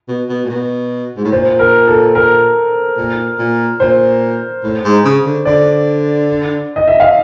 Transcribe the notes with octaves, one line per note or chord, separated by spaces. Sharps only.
B2
B2
A#2
B2
G#2
A2
A#2 C5
A#4
A4
A#4
A#2
A#2
A#2 C5
A2
G#2
C#3
D3
D3 D5
D#5
E5
F5